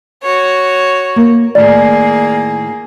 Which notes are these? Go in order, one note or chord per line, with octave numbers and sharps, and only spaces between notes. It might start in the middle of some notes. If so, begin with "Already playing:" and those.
F#4 C#5
A#3
A2 D#3 A#3 G#4 D5 A5